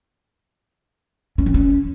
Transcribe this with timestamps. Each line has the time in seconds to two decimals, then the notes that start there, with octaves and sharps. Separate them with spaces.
1.38 C#4
1.46 E3
1.54 C#4